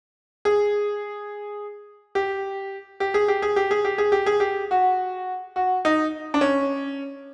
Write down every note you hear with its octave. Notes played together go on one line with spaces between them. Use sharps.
G#4
G4
G4
G#4
G4
G#4
G4
G#4
G4
G#4
G4
G#4
G4
F#4
F#4
D#4
D4
C#4